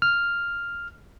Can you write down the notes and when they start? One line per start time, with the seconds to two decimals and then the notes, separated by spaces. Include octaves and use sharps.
0.02 F6